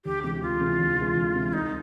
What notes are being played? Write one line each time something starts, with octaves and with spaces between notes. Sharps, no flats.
D2 G4
C3 E3 G#3 G4
D2 F4
C3 E3 G#3
D2
C3 E3 G#3
D2
C3 E3 G#3
C2 D#4